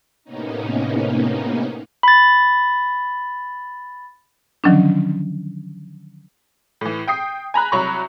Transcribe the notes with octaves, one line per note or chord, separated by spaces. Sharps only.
A2 C3 A#3 B3 C#4 D#4
B5 A6
D3 D#3 F3 F#3 C#4 D4
A2 E3
G5 D#6 C7
G#5 A#5 B5 F#6
C2 F#3 A#5 B5 C#6